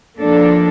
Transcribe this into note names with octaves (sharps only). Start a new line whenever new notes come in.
F3 A#3 D4 A4